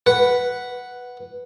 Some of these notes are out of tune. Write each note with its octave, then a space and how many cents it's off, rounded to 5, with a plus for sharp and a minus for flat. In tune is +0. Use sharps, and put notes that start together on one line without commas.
B4 -5 F#5 +0